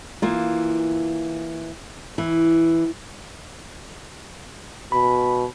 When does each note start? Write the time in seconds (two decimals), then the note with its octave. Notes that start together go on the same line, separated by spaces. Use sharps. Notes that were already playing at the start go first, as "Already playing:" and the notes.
0.22 E3 A#3 F4
2.18 E3
4.92 B2 B5